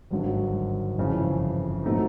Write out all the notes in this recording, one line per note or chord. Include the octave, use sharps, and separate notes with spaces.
G#1 G2 D3 F#3
G1 F2 C#3 E3
A#2 F#3 A3 C4 D#4